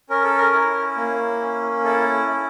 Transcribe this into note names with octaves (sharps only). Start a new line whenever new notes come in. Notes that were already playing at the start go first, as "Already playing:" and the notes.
C#4 A#4
A4
A#4
E4
A#3
C#4
E4 A4
E4